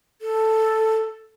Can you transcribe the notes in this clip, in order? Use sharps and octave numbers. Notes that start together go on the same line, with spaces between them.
A4